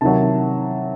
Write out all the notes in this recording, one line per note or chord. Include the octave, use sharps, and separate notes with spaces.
C3 D#3 F#3 A5